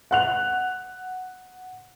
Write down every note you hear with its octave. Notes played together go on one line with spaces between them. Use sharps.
F#5 F#6 F7